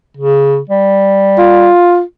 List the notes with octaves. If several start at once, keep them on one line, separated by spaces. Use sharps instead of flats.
C#3
G3
F4